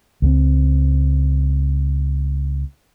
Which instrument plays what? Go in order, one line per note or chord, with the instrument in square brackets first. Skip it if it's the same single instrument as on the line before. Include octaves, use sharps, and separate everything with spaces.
[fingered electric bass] C#2 G3 C4